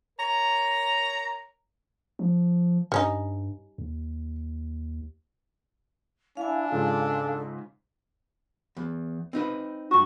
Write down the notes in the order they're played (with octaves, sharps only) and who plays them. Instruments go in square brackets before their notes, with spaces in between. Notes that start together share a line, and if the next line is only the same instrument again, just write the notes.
[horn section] A#4 C#5 A#5
[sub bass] F3
[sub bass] G2 [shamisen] G3 C#4 D#4
[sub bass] D#2
[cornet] D4 [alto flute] E4 [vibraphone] F5 G#5
[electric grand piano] G#2 C#3 F4 [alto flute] A4
[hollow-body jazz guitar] E2
C4 D#4 B4
[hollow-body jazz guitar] G2 F#4 [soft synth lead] C#6